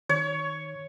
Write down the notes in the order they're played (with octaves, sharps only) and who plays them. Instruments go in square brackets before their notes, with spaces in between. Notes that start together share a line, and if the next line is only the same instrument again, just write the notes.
[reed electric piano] D#3 [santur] C#5